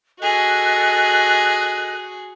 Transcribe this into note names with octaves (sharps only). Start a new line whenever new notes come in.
F#4 G#4 A4 D#5 F#6